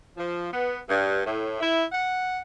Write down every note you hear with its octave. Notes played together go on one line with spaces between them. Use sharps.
F3
B3
G2
A2
E4
F#5